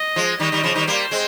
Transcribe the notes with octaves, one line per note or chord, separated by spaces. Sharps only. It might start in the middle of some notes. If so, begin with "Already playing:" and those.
Already playing: D#5
F3 G#3
D#3 G3 D#5
D#3 G3
C#3 F3
D#3 G3
G3 A#3 C5
G#3 C4